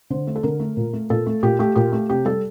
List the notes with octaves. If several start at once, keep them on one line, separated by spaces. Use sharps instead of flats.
D3 C5
A3
A4
D3 A#4
A3
A#2
A3
A#2 A4
A3
A#2 G4
A3 G4
A#2 G4
A3
C3 G4
G3 A4